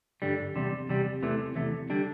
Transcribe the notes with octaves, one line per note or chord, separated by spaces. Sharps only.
G2 D3 G3
E2 C3 G3
E2 C3 G3
E2 C3 E3 A3
E2 C3 E3 A3
D3 G3 D4